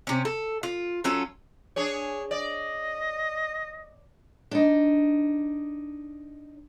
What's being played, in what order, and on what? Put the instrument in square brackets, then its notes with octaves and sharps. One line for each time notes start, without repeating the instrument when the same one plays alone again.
[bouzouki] C3 C#4
A4
F4
F#3 C#4 F4 A4
[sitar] D4 G#4 C#5
[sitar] D5 [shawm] D#5
[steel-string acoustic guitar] D4 D#4